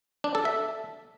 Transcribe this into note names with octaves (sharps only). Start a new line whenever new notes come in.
D4
A4
E5